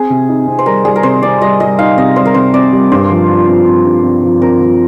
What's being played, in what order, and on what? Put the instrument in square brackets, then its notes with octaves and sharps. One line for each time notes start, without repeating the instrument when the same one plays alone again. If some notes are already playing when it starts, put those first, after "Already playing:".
Already playing: [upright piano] C4 [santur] G#4
[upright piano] C3
D#4
C4
[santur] C5
[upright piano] G3 [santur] A#4
[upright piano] G3 [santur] G#4
[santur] A#4
[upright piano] C3 [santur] C5
[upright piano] C4 [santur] D5
[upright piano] G3 [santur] D#5
[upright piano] G3 [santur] D#5
[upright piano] D#4 [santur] F5
[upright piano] C3 [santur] D#5
[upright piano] G3 [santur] C5
[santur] A#4
[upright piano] C3 [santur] C5
[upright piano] C4 [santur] D5
[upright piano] G3
[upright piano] G2 [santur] C5
[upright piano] F3
F3
C4
C4
G2
C4
F3
[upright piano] C4 [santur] A#4
[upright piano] F3